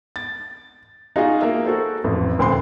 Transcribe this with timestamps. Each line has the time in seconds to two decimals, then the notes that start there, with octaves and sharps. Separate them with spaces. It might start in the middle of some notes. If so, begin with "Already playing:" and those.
0.16 A6
1.16 D#4 F4 F#4 G#4 D#5
1.41 A#3 A#4 E5
1.65 F#4 A4 C5
2.04 A1 F2
2.38 D#1 D2 C4 B4 C6